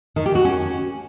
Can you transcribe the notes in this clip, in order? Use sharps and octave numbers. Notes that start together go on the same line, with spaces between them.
D#3
G4
F#4
C#4